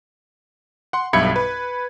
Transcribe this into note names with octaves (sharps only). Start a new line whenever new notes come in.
F#5 C6
B1 G2 E5 B5 G#6 C#7
B4